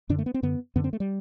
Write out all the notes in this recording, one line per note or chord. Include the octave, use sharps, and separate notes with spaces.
F#2 D3 D4
A3
B3
C4
F#2 D3 B3
F#2 D3 B3
C4
A3
G3